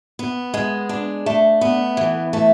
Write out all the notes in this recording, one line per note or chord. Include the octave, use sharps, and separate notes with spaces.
B3
G#3
D4
A3
B3
E3
A3